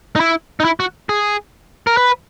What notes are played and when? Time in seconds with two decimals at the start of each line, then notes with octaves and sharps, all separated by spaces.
0.16 D#4
0.20 E4
0.60 D#4
0.65 E4
0.80 F#4
1.09 G#4
1.87 A#4
1.97 B4